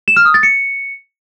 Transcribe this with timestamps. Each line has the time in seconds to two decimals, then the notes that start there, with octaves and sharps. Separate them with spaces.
0.08 E7
0.16 F6
0.25 D#6
0.34 A6
0.43 C#7